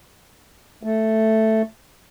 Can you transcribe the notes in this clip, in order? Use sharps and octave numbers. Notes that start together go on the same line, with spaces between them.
A3